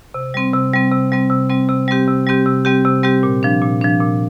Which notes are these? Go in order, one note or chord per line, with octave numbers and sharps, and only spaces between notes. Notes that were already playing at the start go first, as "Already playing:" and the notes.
C3
G3 C4
C3
G3 C4
C3
G3 C4
C3
G3 C4
C3
G3 C4 G4
C3
G3 C4 G4
C3
G3 C4 G4
C3
G3 C4 G4
A#2
F3 D4
A#2
F3 D4
A#2